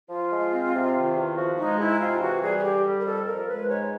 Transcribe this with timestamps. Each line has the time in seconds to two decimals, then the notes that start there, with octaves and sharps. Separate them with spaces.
0.09 F3 F4
0.31 G#3
0.51 C4
0.73 C3
0.94 D#3
1.15 E2
1.36 F3 F#4
1.57 G#3 D#4
1.78 G#2 E4
1.99 C3 F4
2.21 E3 F#4
2.41 G3 G#4
2.57 G#4
2.62 D3 G4
2.84 G3 G4
2.99 A#4
3.05 F2 A4
3.26 F3 A#4
3.47 G#3 B4
3.68 G#2 C#5